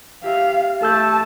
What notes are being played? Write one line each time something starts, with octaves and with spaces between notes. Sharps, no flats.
G4 E5 F5
A3 A4 A5 E6 G6